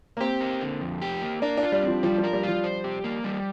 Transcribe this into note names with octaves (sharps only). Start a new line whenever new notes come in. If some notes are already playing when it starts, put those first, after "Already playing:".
A#3
C4 G4
A#3
D3
F2
G4
A#3
D4 A#4
D4
F4
G3
F3 C4
F3 G3
F3
A#4
G3
F3 F4
C5
G4
A#3
G3